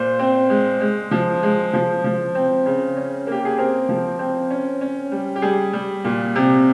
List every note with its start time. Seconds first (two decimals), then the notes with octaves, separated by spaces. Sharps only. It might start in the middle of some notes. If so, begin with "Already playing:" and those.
Already playing: A#2 C5
0.19 C4
0.50 G#3
0.81 G#3
1.11 F3
1.43 G#3
1.73 F3
2.04 F3
2.35 C4
2.66 C#3
2.97 C#4
3.27 A#3 G4
3.45 G#4
3.58 C4 A#4
3.89 F3
4.19 C4
4.50 C#4
4.81 C#4
5.12 G3
5.36 G4
5.42 G3 G#4
5.73 G3
6.04 A#2
6.36 C3